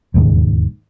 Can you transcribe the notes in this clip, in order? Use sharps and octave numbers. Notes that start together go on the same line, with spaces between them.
E1 D#2 G#2 C#3